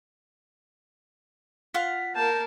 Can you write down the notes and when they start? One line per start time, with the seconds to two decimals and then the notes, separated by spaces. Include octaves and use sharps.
1.74 F4 F5 F#5 B6
2.15 A#3 A#4 A5 G6